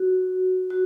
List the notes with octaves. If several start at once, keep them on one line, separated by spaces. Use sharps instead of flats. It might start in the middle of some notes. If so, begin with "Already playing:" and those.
Already playing: F#4
F#4